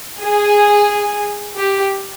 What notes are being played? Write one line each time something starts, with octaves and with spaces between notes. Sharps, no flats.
G#4
G4